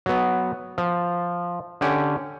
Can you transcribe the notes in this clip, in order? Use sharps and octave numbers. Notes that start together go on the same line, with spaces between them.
F#3 B3
F3
D3 C#4 G4